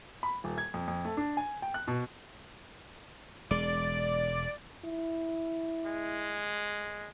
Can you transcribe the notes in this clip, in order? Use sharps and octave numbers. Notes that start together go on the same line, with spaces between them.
B5
D#1
G#6
F2
F2
A3
D4
G#5
G5
F#6
B2
E1 G#3 D5
E4
G#3